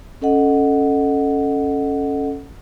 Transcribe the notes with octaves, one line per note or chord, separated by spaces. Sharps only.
C#4 A4 D#5 F#5